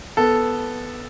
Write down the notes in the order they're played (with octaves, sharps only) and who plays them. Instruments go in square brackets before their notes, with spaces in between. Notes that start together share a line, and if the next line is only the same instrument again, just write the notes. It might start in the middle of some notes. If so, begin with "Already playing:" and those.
[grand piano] B3 A4